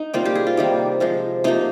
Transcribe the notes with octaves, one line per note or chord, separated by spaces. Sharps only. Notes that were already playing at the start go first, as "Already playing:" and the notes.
Already playing: D#4
C3 G3 A#3 F4
G4
G#4
F4
C3 D#3 G3 A#3
C3 F3 G#3
C3 F3 A#3 D#4